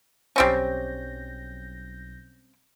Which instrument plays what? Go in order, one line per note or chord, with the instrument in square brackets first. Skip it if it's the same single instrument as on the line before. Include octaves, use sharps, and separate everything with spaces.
[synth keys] B1 G6 A#6 [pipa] G3 C4 C#4